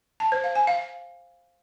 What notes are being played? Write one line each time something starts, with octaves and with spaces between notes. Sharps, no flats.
A5
C5
F5
G#5
F5